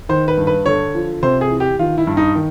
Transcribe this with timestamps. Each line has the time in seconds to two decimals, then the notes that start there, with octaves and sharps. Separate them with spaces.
0.09 D#3 C5
0.28 B4
0.38 G2
0.47 B4
0.66 D3 C#5
0.95 F3
1.23 C3 C5
1.41 G#4
1.51 E3
1.60 G4
1.79 D#3 F4
1.98 E4
2.07 G2
2.17 D#4
2.35 D#3